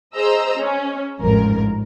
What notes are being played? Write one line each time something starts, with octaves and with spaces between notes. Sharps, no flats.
G#4 C5 D#5 A#5 E6
C#4
A1 F2 G#2 A#4